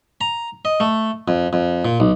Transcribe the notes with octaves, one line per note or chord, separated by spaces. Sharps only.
A#5
D#5
A3
F2
F2
A#2
B1